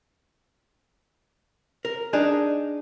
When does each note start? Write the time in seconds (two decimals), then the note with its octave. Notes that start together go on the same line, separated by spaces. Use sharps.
1.85 A#4
2.13 D4 D#4 G#4 D#5